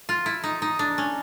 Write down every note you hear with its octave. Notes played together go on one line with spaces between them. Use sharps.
F4
E4
D#4
D#4
D4
C#4